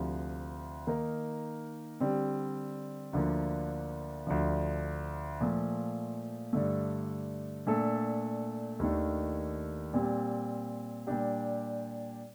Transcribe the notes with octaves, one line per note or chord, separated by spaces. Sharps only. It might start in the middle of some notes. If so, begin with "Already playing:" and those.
Already playing: D2 C3 F3
D#3 A#3 D#4 A#4
D3 G3 C4
D2 D3 F3 A#3
D2 D3 F3
A#2 F3 A3
G2 D3 A3
A#2 A3 D4 A4
D#2 D#3 A3 D4
A#2 G3 C4
A#2 G3 D4 G4